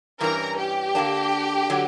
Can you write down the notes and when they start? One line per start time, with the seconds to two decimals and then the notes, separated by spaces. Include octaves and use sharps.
0.20 G2 E3 G3 C#4 A#4 A#5
0.58 G4 G5
0.95 D3 A#3 D4
1.70 D3 F#3